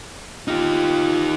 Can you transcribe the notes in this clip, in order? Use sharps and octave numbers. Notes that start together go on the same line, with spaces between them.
D#4 F4 G4